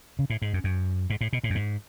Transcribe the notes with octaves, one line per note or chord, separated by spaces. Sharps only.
C#3
A2
G#2
F#2
F#2
G#2
A2
B2
A2
F#2
G#2